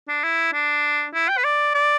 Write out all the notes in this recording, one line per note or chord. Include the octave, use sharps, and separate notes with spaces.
D4
E4
D4
E4
G5
B4
D5
D5